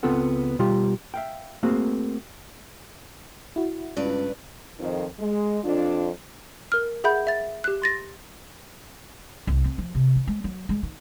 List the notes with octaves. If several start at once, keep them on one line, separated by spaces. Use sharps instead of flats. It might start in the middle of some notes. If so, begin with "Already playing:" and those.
C#2 B3 C4 F4 A4 F#5
B2 G3 F4 G4
E5 F5 G5
A3 A#3 C4 F#4 G#4
E4 F#4
C#2 G2 B4 D5
F2 D#3
G#3
F2 D4 F4
A#4 F6
G#4 E5 F#5 B5 G6
E5 A6
G4 F#6
C6 A6 A#6
C2
C4
F3
C3
D#3
G#3
F#3
G#3
D#3